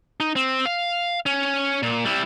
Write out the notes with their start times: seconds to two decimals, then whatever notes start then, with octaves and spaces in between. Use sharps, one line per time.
0.20 D#4
0.36 C4
0.66 F5
1.26 C#4
1.83 A#2
2.05 G3 E4